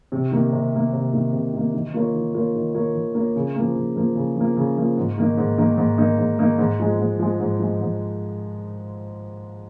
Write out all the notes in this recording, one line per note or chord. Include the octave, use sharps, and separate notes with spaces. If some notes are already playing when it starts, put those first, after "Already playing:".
C3
D#3 A#3
C3
D#3 A#3
C3
D#3 A#3
C3
D#3 A#3
D#3
A#3 F4 A#4 C#5
D#3
A#3 F4 A#4 C#5
D#3
A#3 F4 A#4 C#5
D#3
A#3 F4 A#4 C#5
C#3
F3 A#3
C#3
F3 A#3
C#3
F3 A#3
C#3
F3 A#3
G#2
D#3 A#3 D#4
G#2
D#3 A#3 D#4
G#2
D#3 A#3 D#4
G#2
D#3 A#3 D#4
G#2
F3 G#3
G#2
F3 G#3
G#2
F3 G#3
G#2